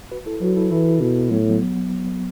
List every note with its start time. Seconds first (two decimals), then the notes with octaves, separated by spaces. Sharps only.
0.12 F#4 B4
0.26 E4 A4
0.41 F#3 F#4 B4
0.56 E4 A4
0.71 E3 E4 A4
1.01 B2
1.30 A2 F#3 B3
1.50 F#3 B3